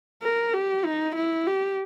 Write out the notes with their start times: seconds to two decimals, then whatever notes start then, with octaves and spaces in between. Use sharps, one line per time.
0.23 A#4
0.53 G4
0.85 D#4
1.16 E4
1.47 G4